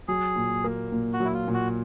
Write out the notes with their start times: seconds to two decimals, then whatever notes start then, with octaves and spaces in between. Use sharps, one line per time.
0.08 F#3 G#4
0.36 A#2
0.64 A#3
0.92 A#2
1.13 F#4
1.20 F#3
1.25 E4
1.34 F4
1.48 A#2
1.54 F#4